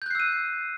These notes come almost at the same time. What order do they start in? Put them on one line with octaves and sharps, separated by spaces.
G6 F#6 C7 E6 D#7